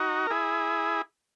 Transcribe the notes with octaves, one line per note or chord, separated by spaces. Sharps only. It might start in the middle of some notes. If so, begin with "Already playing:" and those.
Already playing: D#4 F#4
A#4
E4 G#4